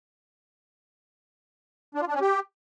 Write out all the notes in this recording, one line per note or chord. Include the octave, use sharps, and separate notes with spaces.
D4
F4
D4
C#4
G4